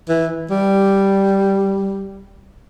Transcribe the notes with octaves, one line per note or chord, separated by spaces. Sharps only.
E3
G3